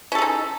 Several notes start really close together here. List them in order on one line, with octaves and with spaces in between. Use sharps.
C#4 A4 G#4 D#4